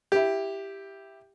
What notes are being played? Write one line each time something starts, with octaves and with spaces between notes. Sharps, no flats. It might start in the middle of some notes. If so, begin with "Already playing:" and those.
E4 G4